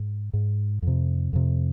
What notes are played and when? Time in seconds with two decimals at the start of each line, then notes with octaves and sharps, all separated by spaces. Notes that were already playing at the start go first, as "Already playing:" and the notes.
Already playing: G#2
0.33 G#2
0.82 F2 C3
1.33 F2 C3